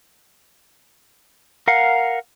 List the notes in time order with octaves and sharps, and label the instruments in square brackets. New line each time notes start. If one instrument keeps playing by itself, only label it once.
[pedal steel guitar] A#4 F5 F#5